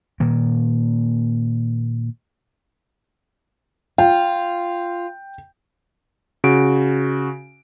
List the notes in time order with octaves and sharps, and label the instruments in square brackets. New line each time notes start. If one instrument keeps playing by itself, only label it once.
[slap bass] A#2 D#3 A#3
[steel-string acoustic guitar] F4 [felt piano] G5
[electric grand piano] C#3 F#4 D7